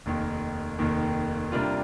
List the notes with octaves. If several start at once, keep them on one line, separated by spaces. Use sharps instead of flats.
F1 D#2 D#3
F1 D#2 D#3
C3 G3 A#3 D4 F4